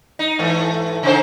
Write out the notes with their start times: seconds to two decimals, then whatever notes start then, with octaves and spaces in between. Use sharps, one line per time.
0.19 D#4
0.39 G#2 E3 A3
1.03 C#3 D#4 C5